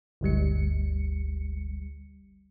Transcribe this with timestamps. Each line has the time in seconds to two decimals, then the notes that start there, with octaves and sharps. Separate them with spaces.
0.21 G1 D2 G3 C#7